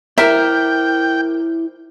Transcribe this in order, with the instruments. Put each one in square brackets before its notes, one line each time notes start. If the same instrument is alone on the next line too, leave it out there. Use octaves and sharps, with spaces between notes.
[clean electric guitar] E4 C5 D5 [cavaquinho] A#4 [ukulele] E5 [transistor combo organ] G5